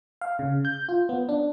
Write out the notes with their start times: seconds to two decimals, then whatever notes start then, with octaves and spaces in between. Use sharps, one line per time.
0.21 F5
0.39 C#3
0.65 G6
0.89 F4
1.09 B3
1.29 D4